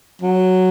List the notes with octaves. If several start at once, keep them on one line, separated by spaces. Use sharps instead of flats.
F#3